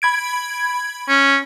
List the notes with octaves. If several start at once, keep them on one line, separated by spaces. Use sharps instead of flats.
B5 G#6 D7
C#4